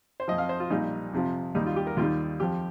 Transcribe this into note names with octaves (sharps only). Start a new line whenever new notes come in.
C5
F2 F3 D#5
F5
C5
F4
A#1 A#2 G3 D#4
F2 C3 F3
D#2 D#3 G3 D#4
F4
G4
A#4
D#2 D#3 G3 F4
F2 F3 G4